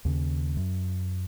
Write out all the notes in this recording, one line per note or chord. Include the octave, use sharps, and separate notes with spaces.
D#2 C#3
F#2